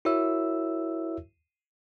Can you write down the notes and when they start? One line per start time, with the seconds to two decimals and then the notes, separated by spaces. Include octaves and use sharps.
0.05 E4 F#4 A#4 C#5 E5 E6